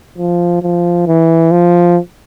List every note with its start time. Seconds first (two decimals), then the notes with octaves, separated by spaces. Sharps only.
0.18 F3
0.62 F3
1.07 E3
1.51 F3